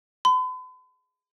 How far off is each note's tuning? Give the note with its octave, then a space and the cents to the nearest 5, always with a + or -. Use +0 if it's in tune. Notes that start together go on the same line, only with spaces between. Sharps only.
B5 +45